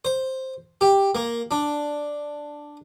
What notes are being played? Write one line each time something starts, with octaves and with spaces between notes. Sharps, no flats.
C5
G4
A#3
D4